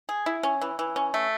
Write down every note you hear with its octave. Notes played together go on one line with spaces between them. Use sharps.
G#4
E4
C#4
E3
E3
C#4
A3